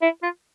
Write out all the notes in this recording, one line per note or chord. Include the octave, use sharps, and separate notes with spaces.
E4
F4